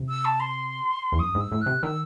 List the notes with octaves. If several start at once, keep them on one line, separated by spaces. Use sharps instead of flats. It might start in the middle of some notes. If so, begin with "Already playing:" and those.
Already playing: C3
E6
A5
C6
E2
F#2 D#6
G#2
E6
A2
C3 F#6
D#3 E6